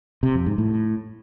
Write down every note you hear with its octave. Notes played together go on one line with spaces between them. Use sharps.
C3
F2
G#2
A2